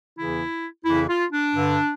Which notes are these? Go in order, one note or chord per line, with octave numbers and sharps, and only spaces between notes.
E2 C#3 E3 E4
F2 C#3 E3 E4
F4
D4
G2 D3